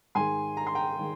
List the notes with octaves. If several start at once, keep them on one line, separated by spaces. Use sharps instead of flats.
G#2 D#3 G#3 G#5 C6
A#5
C6
G5 A#5
D#3 G#3